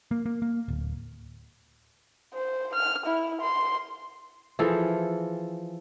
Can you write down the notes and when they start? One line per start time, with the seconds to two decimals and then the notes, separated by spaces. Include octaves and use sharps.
0.11 A#3
0.26 A#3
0.42 A#3
0.68 D1
2.34 C5
2.75 F6
3.06 E4
3.41 C6
4.59 E3 F3 G#4 A4